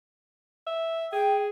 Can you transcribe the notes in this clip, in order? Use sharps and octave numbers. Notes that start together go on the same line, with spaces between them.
E5
G#4 G5